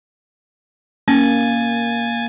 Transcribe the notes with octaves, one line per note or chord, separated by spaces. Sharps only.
A#3 C#4 G#5 A6